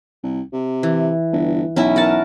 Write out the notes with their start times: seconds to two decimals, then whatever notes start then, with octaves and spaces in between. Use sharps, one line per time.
0.23 C2
0.53 C3
0.83 E3
1.32 G1
1.76 B1 C#4 E4
1.96 A#4 F#5 A5